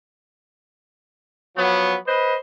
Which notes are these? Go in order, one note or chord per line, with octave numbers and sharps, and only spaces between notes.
F3 F#3 B3
B4 C5 D#5